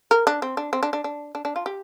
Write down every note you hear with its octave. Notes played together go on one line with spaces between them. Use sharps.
A#4
D4
C4
D4
C4
D4
D4
D4
D4
D4
F4
G4